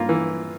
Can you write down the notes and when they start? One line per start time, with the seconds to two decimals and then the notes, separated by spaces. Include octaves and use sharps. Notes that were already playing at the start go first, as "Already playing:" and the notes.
Already playing: G2 A#3 F4
0.09 E3